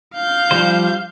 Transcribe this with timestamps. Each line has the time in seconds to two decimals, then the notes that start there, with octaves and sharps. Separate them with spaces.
0.15 F5 G6
0.51 F3 G3 C5